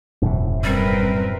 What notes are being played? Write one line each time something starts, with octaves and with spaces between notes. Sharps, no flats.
E1 F#2 A2 C3
G3 C4 A#4 B4